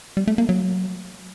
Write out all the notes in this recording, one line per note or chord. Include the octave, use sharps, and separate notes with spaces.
G3
A3
A#3
F#3